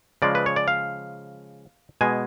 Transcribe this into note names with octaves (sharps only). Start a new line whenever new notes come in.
C#3 F3 G#3 D5
B4
C#5
D5
F5
B2 G#3 G#5